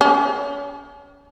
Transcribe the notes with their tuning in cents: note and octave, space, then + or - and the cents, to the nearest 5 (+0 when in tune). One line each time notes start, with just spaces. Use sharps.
C#4 +35